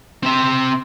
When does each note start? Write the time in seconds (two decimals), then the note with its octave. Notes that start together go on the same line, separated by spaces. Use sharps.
0.23 C4 E5